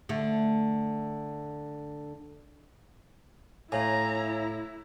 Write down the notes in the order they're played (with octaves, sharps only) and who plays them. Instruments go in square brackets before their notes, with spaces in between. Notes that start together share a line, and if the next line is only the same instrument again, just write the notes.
[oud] D3 A3
[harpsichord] A2 [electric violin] E4 [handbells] C#5 F5 G#5 [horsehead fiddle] A#5